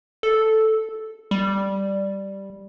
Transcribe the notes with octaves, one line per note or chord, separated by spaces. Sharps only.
A4
G3